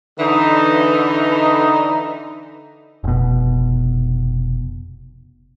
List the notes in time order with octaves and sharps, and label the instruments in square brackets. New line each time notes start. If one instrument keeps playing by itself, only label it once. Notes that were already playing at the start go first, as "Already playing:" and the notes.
[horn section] D3 E3 D#4
[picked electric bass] F1 B2